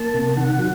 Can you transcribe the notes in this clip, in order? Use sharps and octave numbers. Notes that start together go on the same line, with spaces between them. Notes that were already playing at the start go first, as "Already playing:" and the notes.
Already playing: A#3 A5
C3
D#3 F#5
F#3